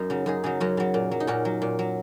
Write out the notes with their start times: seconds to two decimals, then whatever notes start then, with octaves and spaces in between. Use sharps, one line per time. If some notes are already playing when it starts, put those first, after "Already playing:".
Already playing: F#2 C#4 D#4
0.10 C#3 F#3
0.26 F#2 D#4 G#4
0.44 C#3 F#3 D#4 G#4
0.60 F#2 C#4 F#4
0.77 C#3 F#3
0.94 A#2
1.11 F#3
1.20 D#4
1.27 A#2 C#4 F#4
1.45 F#3
1.62 A#2
1.79 F#3